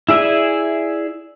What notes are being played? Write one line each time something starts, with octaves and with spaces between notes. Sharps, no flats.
E4 G#4 D5 E5 G#5